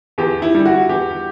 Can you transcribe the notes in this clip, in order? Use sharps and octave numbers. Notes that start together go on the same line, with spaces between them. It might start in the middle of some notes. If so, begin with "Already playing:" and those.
E2 G4
E4
D3 G3
F#4
E2 G4